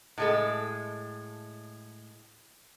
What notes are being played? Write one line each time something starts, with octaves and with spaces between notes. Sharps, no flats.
A2 G#3 A4